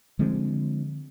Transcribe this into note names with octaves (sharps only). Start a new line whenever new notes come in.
D3 F3 G#3 C4